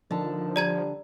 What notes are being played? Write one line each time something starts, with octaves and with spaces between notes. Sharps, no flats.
D3 D#3 F3 A5
G3 D5 A#5 G#6